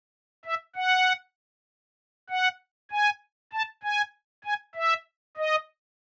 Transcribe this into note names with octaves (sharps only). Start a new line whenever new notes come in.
E5
F#5
F#5
G#5
A5
G#5
G#5
E5
D#5